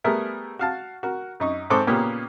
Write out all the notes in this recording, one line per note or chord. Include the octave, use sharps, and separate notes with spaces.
G3 A3 B3 G#4 A#4 E5
F#4 F5 A5
F#4 A#4
F#2 D#4 C#6
G#2 C4 A4 C5 C#6 D6
A#2 C#3 A#3 B3 C#4 G4